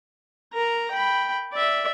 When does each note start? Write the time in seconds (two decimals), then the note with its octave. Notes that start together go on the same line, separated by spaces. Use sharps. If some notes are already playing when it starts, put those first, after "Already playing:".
0.53 A#4 A#5
0.91 G5 B5
1.53 D5 E5